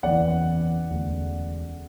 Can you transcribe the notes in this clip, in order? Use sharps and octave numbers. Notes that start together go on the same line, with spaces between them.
F#1 E2 C#3 E3 D5 F#5
E1 D2 C#3